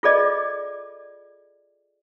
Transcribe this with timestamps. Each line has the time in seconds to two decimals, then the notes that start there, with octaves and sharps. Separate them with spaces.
0.03 F4 G#4 A4 D5 D#5